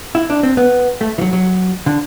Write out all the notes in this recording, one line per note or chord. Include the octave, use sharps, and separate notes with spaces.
E4
D4
C4
B3
A3
E3
F#3
F#3
D3